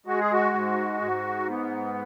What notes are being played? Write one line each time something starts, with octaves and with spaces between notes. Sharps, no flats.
G#3 F#4
G#4
F#4
G#2
G#2
B3